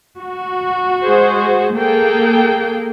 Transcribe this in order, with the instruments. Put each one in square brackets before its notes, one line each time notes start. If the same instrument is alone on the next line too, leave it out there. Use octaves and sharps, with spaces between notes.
[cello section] F#4
[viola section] G#3 G#4 C5
[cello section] A#3 [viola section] G#4 A4 G5